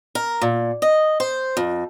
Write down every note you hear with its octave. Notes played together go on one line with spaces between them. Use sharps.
A#4
A#2
D#5
C5
F2